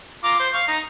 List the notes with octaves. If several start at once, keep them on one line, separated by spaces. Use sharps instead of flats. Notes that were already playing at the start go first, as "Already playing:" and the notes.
F4 A#5 D6
C5 C6
F5 C#6
D#4 A#5